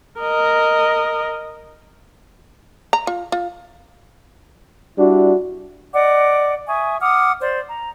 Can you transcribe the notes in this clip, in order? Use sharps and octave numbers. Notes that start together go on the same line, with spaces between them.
A#4 D#5
A#5
F4
F4
G3 D4 E4 F#4
D5 D#5 F#5 D6
E5 G#5 C#6 D#6
F#5 D6 D#6 F6
C5 D5
A#5